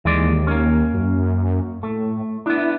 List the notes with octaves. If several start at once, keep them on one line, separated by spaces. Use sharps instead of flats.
D#2 E3 G#3 D5
A#3 C#4
F#2
A2 A3
B3 D4 E4